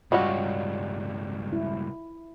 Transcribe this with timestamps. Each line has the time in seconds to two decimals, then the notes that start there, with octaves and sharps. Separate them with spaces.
0.12 C#2 G2 G3 C#4 F4 F#4 D#5
1.53 E4